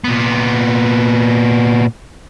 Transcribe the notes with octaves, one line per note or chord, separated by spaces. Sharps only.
A#2 B3